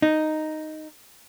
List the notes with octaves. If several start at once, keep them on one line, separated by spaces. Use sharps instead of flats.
D#4